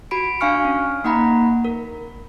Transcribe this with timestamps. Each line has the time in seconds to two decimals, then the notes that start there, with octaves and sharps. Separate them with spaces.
0.11 F#4 B5 D7
0.40 D4 F5 G#5 C#6 F6 C#7
0.65 C#4
1.04 A#3 D#4 F#5 A#5 B5
1.65 A#4